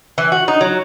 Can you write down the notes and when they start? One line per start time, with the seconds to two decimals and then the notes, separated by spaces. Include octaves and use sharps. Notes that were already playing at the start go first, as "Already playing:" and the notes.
0.18 E3
0.32 F#4
0.48 D#4
0.61 F#3